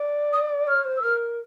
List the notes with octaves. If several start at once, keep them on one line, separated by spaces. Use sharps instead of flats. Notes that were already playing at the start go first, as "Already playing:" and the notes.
Already playing: D5
D#6
C#5 F6
C5
E6
A#4 F6